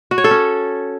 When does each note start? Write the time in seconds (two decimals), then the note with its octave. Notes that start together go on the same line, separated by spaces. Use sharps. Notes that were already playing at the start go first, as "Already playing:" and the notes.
0.11 F#4
0.18 C#5
0.24 A4
0.31 C#4